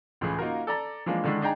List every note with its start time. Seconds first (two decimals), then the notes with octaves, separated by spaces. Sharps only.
0.21 C#2 A2 C#3 E3 G#4
0.39 A#3 D#4 F4 F#4 A#4
0.67 A4 D5 A#5
1.06 E3 F3 G#3 A#3 D4
1.24 D3 D#3 G#3 D4 E4
1.41 D4 D#4 G#4 G5 A#5